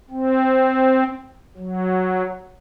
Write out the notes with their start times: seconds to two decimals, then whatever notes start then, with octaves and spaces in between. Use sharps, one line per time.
0.11 C4
1.57 F#3